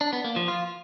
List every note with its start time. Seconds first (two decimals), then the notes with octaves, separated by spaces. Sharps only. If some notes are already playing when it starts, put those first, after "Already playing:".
0.01 D4
0.13 B3
0.24 A#3
0.36 F3
0.48 F4